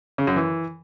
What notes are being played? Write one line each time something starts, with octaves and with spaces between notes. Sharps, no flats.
C#3
F#2
E3